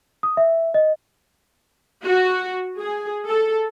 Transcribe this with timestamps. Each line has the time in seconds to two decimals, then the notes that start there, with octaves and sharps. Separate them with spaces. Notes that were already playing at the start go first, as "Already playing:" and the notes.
0.23 D#6
0.37 E5
0.74 D#5
2.05 F#4
2.78 G#4
3.28 A4